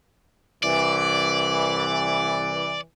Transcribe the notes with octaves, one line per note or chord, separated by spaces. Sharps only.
C2 E3 D5